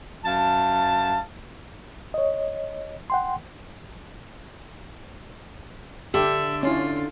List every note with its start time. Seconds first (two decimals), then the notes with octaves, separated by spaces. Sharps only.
0.24 F#2 F5 A5
2.14 C#5 D#5
3.10 F#5 G5 C6
6.14 D3 G4 E5
6.63 C#4 E4 F4